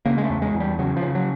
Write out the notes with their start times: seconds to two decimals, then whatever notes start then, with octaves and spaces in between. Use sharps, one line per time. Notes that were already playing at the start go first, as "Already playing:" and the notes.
0.06 C#3 A#3
0.18 G#3
0.24 A3
0.30 E2
0.42 G#3
0.54 E2
0.60 G3
0.79 C#3 F#3
0.97 F3
1.03 C#3
1.15 F#3